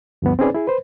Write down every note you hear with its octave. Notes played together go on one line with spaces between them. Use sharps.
D2 G2 F3 B3
C4 C#4 D#4 G#4 B4 D5
E4 G#4
B4 C5